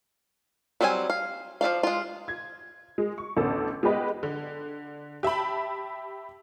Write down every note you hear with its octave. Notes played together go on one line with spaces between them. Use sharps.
F#3 G3 C4 G#4 G#5
F5
F3 F#3 D5 F5
G#3 F4
G#6
G#3
C#6
A1 D2 B3 C#4 A4
G#3 B3 G4 B4 D#5
D3
G4 E5 A5 B5